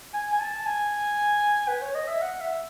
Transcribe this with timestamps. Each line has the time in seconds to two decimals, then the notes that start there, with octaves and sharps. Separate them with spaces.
0.14 G#5
0.33 G#5
0.40 A5
0.66 G#5
1.68 B4
1.81 C#5
1.94 D#5
2.08 E5
2.22 F#5
2.40 E5